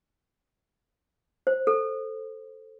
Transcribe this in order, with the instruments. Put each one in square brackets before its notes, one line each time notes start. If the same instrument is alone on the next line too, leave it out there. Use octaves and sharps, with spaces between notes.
[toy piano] C5
A4